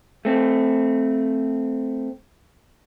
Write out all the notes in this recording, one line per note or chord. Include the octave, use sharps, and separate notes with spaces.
A3 C4